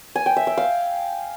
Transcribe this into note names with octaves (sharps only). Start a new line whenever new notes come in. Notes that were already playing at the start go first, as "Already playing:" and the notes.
G#5
G5
E5
E5
F5